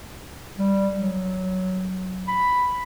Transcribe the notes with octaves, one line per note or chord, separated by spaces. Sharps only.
G3
F#3
B5